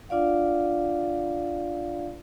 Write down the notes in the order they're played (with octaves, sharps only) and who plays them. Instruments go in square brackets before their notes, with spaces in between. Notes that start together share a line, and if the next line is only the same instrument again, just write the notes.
[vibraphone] D4 F4 D5 F5 F#5